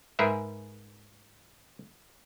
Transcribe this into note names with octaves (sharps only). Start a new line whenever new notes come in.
G#2 G#4 A#4 B4 E5